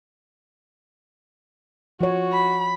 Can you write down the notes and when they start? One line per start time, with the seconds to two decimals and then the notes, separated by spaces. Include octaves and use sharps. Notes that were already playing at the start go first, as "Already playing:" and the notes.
2.01 F3 F#4 C#5
2.33 B5